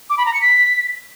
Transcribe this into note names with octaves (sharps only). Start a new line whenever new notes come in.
D6
B5
A#5
C#7
B6